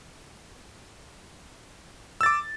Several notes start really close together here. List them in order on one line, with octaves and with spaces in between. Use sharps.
E6 A6 D6